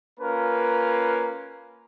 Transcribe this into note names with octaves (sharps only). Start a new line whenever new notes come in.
A#3 C#4 F4 A#4 B4